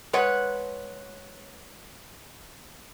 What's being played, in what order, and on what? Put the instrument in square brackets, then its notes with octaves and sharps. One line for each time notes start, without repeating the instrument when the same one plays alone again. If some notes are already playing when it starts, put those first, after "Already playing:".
[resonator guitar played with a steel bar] G#3 B4 C#5 F#5